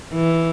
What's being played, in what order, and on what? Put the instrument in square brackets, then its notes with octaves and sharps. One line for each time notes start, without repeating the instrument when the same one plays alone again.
[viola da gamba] E3